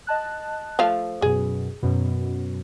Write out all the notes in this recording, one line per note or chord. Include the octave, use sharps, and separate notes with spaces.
D#5 A5 F#6
F3 A3 F5
F#2 B2 G#4
F#2 B2